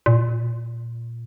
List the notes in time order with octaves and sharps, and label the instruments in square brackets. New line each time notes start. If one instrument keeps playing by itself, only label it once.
[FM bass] A#2